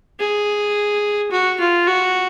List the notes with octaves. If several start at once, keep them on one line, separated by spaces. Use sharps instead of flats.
G#4
F#4
F4
F#4